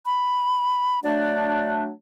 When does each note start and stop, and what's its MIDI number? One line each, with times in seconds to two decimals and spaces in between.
0.06 1.00 83
1.04 1.90 54
1.04 1.90 57
1.04 1.90 62
1.04 1.71 74